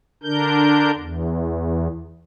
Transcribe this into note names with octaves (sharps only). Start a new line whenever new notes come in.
D3 D4 A#4 G6
E2